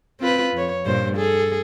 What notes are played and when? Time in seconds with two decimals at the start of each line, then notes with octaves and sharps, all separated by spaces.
0.20 C4 F4 B4
0.54 F2 C#5
0.86 G2 A#2 C5
1.16 G#4 A4